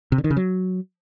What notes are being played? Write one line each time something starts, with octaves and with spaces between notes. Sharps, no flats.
C3
D3
D#3
C#3
F#3